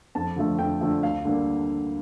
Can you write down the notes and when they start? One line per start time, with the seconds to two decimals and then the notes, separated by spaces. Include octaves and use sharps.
0.15 F2 A5
0.36 D3 F3 A3
0.59 F2 G5
0.81 D3 F3 A3
1.03 D2 F5
1.25 D3 G3 A#3